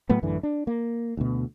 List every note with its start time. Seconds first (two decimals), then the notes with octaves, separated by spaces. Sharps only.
0.09 A2 F#3 A3 B3
0.22 A1 F#2 D3 E3
0.43 D4
0.67 A#3
1.17 D2 B2